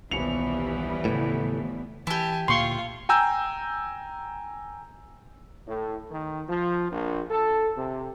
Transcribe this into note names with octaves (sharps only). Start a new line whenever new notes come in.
D#1 B1 E3 G3 B3 C#7 F7
A2 C#3 A3
E3 E4 G4 G#5 A5
D2 A#2 A#3 F4 F5 C6 C#6
G5 G#5 A#5 E6 G6
A2
D#3
F3
A#1
A4
C3